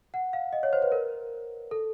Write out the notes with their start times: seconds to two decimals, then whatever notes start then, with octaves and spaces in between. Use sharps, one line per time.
0.14 F#5
0.33 F5
0.53 D#5
0.63 C#5
0.73 C5
0.82 B4
0.92 A#4
1.71 A4